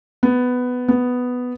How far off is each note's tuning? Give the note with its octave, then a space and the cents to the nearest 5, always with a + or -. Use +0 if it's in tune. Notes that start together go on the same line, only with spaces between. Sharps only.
B3 +10
B3 +5